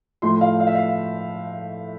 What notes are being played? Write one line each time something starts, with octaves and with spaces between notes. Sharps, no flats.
A2 F3 A3 C6
F5
F5
E5
F5